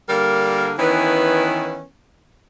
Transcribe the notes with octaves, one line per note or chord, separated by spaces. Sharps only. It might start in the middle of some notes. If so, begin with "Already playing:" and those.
D3 G3 A#3 A#4
D#3 E3 B3 C#4 E4 B4